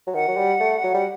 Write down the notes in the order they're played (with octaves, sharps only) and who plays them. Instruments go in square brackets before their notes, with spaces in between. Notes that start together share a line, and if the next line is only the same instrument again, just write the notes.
[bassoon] F#3
[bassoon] D#3 [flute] F#5
[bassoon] F#3
G3
A3
F#3
G3